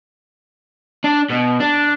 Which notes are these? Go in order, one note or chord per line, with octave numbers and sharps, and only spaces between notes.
D4
B2
D4